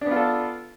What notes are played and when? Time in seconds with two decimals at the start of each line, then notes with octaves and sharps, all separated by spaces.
0.01 D4
0.06 B3
0.11 F4
0.16 A4